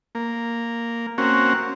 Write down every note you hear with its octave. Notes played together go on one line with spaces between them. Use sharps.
A#3
A#3 C4 C#4 F#4